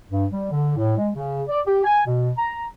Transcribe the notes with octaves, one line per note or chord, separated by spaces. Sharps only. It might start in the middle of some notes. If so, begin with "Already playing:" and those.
G2
G3
D3
A2
G#3
C#3
D5
G4
G#5
B2
A#5